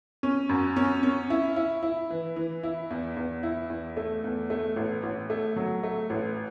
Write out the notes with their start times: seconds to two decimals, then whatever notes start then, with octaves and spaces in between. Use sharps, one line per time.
0.23 C#4
0.49 F#2
0.76 C#4
1.03 C#4
1.30 E4
1.56 E4
1.83 E4
2.10 E3
2.36 E3
2.63 E4
2.90 E2
3.16 E2
3.43 E4
3.70 E2
3.97 A3
4.24 E2
4.50 A3
4.76 A1
5.03 A1
5.30 A3
5.56 F#3
5.83 A3
6.10 A1